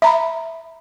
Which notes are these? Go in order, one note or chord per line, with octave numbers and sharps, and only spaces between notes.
E5 A#5 B5